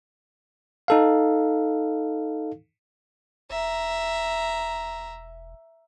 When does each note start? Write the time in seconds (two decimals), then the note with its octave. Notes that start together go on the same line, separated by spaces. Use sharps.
0.88 D#4 A4 F5
3.50 E1 E5 A#5